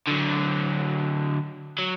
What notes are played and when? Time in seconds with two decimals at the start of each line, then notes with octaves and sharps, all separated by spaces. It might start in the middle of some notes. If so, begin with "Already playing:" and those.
0.07 D3 F#3
1.79 F#3